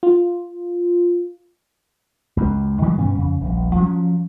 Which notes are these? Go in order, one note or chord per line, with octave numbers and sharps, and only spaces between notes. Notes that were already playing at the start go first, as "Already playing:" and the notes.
F4
C#2 F#2
D#3 E3 G3 G#3
G2 B2 C#4
F2 C#3
D#1 A#1
F3 F#3 A3 C#4